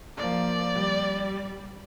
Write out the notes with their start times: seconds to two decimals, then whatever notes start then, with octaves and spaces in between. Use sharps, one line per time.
0.17 F3 A#3 D5
0.74 G3